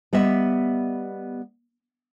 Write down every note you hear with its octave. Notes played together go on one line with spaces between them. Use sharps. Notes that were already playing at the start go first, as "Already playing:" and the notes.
G3 B3 D#5 E5